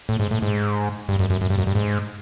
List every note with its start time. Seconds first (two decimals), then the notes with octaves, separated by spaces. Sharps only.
0.09 A2
0.20 G#2
0.31 A2
0.42 G#2
1.09 G2
1.19 F#2
1.30 F#2
1.41 F#2
1.50 G2
1.58 F#2
1.67 G2
1.75 G#2